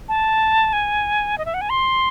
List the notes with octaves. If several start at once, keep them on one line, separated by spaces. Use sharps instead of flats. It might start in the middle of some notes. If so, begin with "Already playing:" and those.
A5
G#5
D#5
E5
F#5
G#5
C6